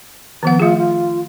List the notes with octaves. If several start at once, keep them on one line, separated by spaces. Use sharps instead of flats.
D#3 F3 B3 F#5
A3 F4 G#4
F4